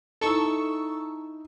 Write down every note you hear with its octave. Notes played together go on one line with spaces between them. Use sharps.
D#4 E4 A4 C#6 E6